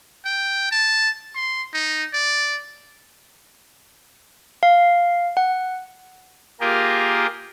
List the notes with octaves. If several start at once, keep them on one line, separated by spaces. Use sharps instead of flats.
G5
A5
C6
D#4
D5
F5
F#5
A#3 F4 G4 G#4 A#4